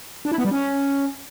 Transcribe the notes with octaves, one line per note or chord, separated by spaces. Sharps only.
D4
E4
B3
G3
C#4